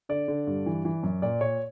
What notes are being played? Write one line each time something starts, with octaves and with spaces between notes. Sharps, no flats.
D3 D5
D3
G2
E3
E3
F#2
A#2 D5
A#2 C#5